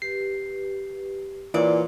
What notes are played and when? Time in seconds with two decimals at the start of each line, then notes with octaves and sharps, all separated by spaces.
0.02 G4 B4 C7
1.54 A#2 E3 C#5 D5